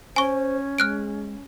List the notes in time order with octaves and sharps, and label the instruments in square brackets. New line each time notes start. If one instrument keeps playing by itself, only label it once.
[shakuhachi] C#4 [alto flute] C5 [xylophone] G#5 C#6
[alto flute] G#3 [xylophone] F6 F#6 D7